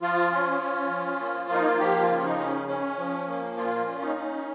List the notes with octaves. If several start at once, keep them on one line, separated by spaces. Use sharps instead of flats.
F3 F4
C#4
C#4
F3
A#3
A#3 D#4
F4
F3 G4
F4
C#3
D#4
C#4
C#4
F3
A#3
A#2 F4
C#4
D#4
C#4